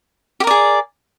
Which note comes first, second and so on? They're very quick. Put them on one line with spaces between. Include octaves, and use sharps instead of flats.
G4 A#4 D5 G#4